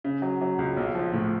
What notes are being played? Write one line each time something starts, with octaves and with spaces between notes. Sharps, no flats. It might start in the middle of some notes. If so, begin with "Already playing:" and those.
C#3
F#3
F#3
C#2
B1
F3
A2